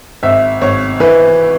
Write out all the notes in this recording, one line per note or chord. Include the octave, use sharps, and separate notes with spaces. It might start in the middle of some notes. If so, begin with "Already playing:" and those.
G#1 E5
G#1 C#5
E3 B4